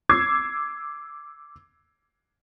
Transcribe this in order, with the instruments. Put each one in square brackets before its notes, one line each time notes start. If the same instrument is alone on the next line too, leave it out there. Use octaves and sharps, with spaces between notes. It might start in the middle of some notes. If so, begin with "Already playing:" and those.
[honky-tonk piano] D6 E6 G#6 C7